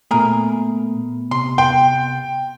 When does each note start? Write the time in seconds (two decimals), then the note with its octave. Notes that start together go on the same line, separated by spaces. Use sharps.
0.11 A#2 A3 B3 G#4 A#4
1.31 C3 C6
1.58 G5 C6